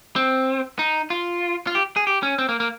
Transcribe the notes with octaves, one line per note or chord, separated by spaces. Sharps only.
C4
D#4
F4
F4
G4
G#4
G4
C#4
C4
A#3
A#3